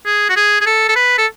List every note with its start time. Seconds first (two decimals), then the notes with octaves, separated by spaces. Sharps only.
0.06 G#4
0.29 F#4
0.36 G#4
0.61 G#4
0.66 A4
0.89 A4
0.96 B4
1.18 A4